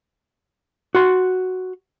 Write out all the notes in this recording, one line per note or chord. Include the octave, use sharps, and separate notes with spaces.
F#4 C6